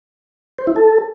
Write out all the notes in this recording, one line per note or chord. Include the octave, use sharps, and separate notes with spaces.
C5
E4
A4